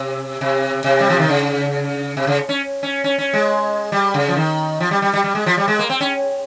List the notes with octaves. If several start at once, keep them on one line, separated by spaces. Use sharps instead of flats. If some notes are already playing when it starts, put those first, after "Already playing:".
Already playing: C3
C3
C3
G3
F3
D#3
C#3
C3
C#3
C#4
C#4
C#4
C#4
G#3
G3
C#3
F3
D#3
F3
G3
G3
G3
G3
G#3
F3
G3
G#3
A#3
C4
C#4